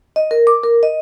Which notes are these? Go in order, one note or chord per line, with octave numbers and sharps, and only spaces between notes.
D#5
A#4
D6
A#4
D#5